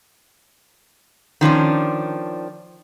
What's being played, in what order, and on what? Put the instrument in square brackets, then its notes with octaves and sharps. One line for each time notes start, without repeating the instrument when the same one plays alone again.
[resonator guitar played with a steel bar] D#3 F3 C#4 D4